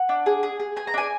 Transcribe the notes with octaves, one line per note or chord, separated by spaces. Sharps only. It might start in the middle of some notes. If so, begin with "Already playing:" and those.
Already playing: F#5
D4
G#4
G#4
G#4
G#4 G#5
A#5
D4 G#5